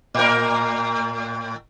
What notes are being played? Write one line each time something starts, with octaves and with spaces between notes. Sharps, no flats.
A2 A#4